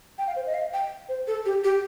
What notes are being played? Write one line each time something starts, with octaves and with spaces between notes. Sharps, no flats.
G5
F5
C5
D#5
F5
G5
C5
A4
G4
G4